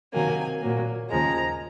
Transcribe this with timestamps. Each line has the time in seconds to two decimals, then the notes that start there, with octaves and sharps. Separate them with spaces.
0.13 C3 D#3 F#3 A#3 G#5
0.61 A#2 F#3 A#3
1.10 D#2 C#3 F3 G#3 A#5